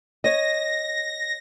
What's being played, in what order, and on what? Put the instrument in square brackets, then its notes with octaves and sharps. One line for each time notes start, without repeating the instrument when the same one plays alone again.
[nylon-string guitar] C#5 D#5 [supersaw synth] A#6